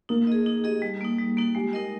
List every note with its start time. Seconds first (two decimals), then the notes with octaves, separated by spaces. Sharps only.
0.09 A#3 D#4
0.27 G#4 D#5
0.46 D#4
0.64 G4 G#4 D#5
0.82 G3
1.01 A#3 D#4
1.18 G3
1.37 A#3 D#4
1.55 G#3 G4
1.73 D#4 A#4 D#5